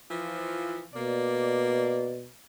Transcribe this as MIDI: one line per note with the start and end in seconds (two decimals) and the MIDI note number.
0.10 0.84 52
0.10 0.84 53
0.94 2.31 47
0.94 2.21 58
0.94 2.21 74